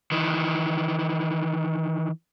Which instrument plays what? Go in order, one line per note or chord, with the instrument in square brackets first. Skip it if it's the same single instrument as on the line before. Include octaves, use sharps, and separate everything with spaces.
[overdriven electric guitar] D#3 E3